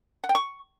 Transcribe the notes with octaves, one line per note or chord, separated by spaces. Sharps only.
F#5
G5
C#6